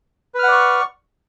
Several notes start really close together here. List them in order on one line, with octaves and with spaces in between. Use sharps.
B4 F6 F#5 D5 C#6